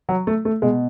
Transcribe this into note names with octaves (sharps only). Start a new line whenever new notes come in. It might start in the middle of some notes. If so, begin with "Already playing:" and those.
F#3
A3
A3
B2 G#3